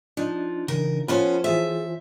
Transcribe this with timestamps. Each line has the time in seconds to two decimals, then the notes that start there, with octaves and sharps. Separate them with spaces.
0.17 F3 D4 D#4
0.68 C#3 E3 A#4
1.08 F3 B3 C#4 F4 A#4 C5 B5
1.44 E3 F4 G#4 A4 C5 E5